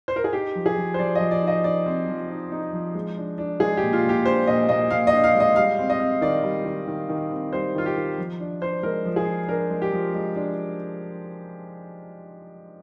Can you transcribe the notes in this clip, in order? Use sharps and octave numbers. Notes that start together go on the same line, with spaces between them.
C5
A#4
G#4
D#4 G4
F3
G#4
F3
C5
F3 D5
F3 D#5
D5
D#4 D#5
D#4 D5
C4
F3
D#4
D#4
F3
G#3
D4
D4
G#3 G#4
A#2 G4
F4
A#2 G4
D4 C5
A#2 D#5
A#2 D#5
A#2 F5
D#5
D4
F5
G#3 D#5
G3 F5
C4
D#5
C4
D#3 D5
G3
D#3
D#3
D#3
C4
G3 C5
D#3 F4
G4
D#3
F3
D4
D4 C5
G#3 A#4
F3
G#4
F3
D4 A#4
G#3
G4
F3
G#3
D4